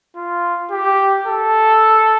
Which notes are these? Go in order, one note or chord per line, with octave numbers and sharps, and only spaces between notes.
F4
G4
A4